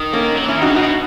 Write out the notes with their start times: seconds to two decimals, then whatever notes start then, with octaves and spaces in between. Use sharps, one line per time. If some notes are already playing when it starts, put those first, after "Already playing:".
Already playing: D#3
0.13 A#3 C#4
0.35 F#3
0.45 E3 C#4 E4
0.55 D#3
0.62 C#3 D#4 F#4
0.76 B2 D#4 F#4